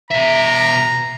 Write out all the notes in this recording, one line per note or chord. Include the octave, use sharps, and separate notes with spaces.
B2 E5 A#5